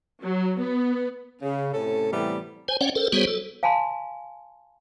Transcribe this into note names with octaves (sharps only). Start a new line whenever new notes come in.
F#3
B3
C#3
A2 C3 C#4 A4
A2 C3 E3 G3 B3
C5 G#5
C#4 C#5 D5 F#5 G5
A4 A#4 C5
G3 B3 F#4 G#4 C5 C#5
A4
F5 G#5 A5 B5 C6